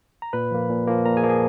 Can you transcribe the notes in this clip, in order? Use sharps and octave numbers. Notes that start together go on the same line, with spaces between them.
A#5
A#2 B4 B5
F3 A#3
A#2
F3 A#3
A#2 A#4 A#5
G#4 G#5
F3 A#3
G#4 G#5